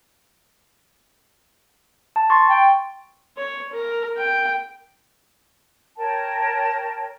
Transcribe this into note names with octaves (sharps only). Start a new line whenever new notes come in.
A5
C6 C#6 A6
G5
C#5
A#4
G5
A#4 C#5 G5 A5